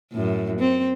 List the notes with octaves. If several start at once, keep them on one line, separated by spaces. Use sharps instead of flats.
F#2 A2
C4